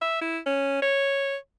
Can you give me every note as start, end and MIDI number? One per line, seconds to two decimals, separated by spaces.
0.02 0.18 76
0.21 0.39 64
0.46 0.78 61
0.82 1.36 73